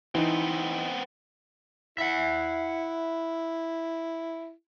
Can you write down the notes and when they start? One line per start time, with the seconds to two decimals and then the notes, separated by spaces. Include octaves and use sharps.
0.15 E3 B3 C4 D#4
1.98 E4 E5 F#5